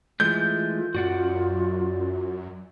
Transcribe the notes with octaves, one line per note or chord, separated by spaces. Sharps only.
E3 G#3 A3 F4 G6
F#2 F#4 D5 F#5